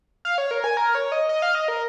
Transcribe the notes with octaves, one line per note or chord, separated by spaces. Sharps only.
F5
C#5
A#4
G#5
A#4
C#5
D#5
D#5
F5
D#5
A#4